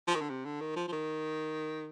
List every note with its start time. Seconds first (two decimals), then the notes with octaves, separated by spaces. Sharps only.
0.08 F3
0.15 D#3
0.21 D3
0.29 C3
0.45 D3
0.61 D#3
0.76 F3
0.88 F3
0.92 D#3